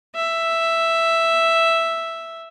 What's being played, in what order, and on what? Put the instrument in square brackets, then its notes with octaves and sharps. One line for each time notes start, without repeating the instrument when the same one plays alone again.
[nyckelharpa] E5